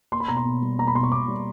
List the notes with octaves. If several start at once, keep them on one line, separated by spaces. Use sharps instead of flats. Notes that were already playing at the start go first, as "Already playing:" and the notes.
A#3 C6
B5
B2 A#5
C6
B2
G3
A#3 A#5
B5
B2 C6
C#6
B2 D6
G3